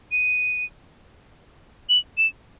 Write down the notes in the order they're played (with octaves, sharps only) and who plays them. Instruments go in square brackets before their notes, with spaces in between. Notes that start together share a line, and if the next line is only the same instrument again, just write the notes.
[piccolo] D#7
F#7
E7